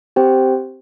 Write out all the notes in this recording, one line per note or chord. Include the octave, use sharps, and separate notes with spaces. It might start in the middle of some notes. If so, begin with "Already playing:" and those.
C4 G4 C5 G5